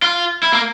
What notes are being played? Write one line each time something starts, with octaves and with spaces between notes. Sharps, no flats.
F4
E4
A#3